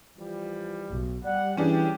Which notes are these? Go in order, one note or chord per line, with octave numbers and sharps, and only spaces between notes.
E3 F3 G3
B1
G3 D5 F#5
E3 C#4 D4 G4 G#4